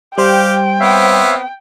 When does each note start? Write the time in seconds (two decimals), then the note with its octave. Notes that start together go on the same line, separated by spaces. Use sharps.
0.18 G3 G4 C5 F5 G5
0.80 B3 C4 C#5 E5 F5